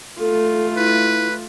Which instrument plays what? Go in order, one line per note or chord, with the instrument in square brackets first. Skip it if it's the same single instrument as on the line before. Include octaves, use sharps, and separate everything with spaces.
[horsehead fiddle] A3 F4 [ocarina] A4
[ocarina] E4 [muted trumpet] B4